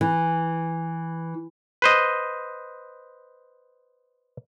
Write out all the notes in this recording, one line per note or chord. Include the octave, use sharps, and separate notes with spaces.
E3
B4 C5 D#5